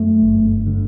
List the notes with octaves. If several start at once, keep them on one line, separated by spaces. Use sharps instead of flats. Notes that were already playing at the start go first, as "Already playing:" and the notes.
Already playing: F#2 A3
G1
D3